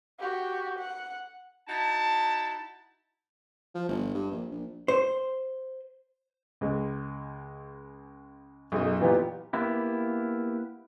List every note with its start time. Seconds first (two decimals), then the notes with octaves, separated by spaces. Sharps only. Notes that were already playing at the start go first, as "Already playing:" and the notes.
0.20 F#4 G4
0.79 F#5
1.68 D#4 E4 F#4 A5
3.75 F3
3.89 G1
4.15 G2
4.32 A#1
4.51 A#1
4.88 C5
6.61 C#2 G#3
8.72 B1 F#2 G#4 D#5
9.00 A#2 E3 B3 D#4 F4 G4
9.53 A#3 B3 E4 G4